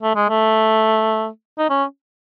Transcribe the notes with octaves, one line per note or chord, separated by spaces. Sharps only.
A3
G#3
A3
D#4
C#4